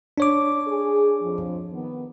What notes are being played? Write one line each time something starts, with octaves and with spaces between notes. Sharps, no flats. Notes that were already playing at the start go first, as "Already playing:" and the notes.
D4 C#5 D6
G#4
F2 F3
D#3 B3